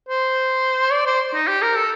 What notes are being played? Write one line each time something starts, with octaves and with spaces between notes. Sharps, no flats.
C5
D5
C5
D#4
G4
A#4
A4